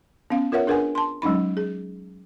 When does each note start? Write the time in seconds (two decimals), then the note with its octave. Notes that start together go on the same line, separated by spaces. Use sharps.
0.30 B3 C#4 F5
0.52 F4 A#4 B4 C#5 E5 F#5
0.67 D4 G#4 A#4 B4 F#5 G#5
0.95 A5 C6
1.22 F#3 G#3 C#4 D#4 B5
1.57 G#4